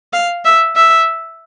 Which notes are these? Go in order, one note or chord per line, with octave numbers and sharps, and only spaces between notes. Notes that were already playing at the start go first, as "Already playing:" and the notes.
F5
E5
E5